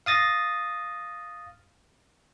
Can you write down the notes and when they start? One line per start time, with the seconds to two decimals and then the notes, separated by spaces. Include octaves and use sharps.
0.06 F5 D#6 A6 A#6